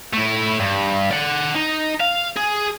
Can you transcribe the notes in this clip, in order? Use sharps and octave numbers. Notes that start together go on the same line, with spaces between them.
A3 E4
G2
D5 F#5
D#4
F5
G#4